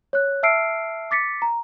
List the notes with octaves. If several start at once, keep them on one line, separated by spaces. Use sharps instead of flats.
C#5 F#6
E5 A5 E6 F6 C7 D7
D6 A6 B6 C#7
A#5